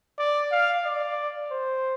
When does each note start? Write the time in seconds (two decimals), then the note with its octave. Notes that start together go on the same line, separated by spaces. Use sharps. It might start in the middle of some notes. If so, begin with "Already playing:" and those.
0.19 D5
0.52 F5
0.85 D5
1.51 C5